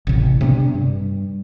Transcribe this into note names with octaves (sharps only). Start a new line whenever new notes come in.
A1 C3
C3 B3 C#4 D4
G2